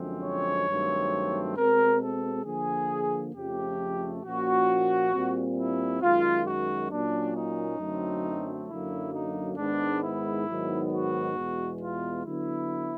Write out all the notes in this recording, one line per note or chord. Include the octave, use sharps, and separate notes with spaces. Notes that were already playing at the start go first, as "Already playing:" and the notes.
Already playing: F#2 D3 F3 G#3 C4
C#5
G2 D#3 F#3 A3 C4
B2 G#3 C4 A#4
A4
D3 F3 A#3 G#4
F2 C#3 F3 A3 G4
A#2 F3 A#3 C#4 F#4
A#2 G3 C4
E4
F#2 D#3 G#3 F4
F#4
A#2 F#3 A#3 C#4 D4
D#4
F#2 D3 F#3 A3 C4
F#2 D3 F#3 A#3 E4
D#4
G#2 D#3 G#3 B3 D4
E4
G#2 D#3 F#3 B3
F#4
E2 B2 G#3
F4
D3 F#3 B3 E4